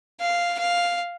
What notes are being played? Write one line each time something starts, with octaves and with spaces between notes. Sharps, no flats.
F5
F5